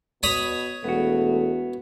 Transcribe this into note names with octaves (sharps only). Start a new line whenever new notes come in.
B2 C#5 B5 D#6
E1 A3 B3 F#4